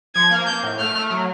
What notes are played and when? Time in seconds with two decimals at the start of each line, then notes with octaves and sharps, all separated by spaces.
0.15 F3 G#6
0.31 A#3
0.47 A#3 G6
0.63 A2
0.79 A3 F6
0.95 A3
1.11 F#3